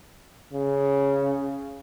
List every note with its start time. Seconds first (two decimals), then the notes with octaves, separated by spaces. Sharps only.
0.53 C#3